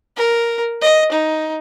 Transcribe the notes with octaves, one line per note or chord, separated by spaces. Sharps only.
A#4
D#5
D#4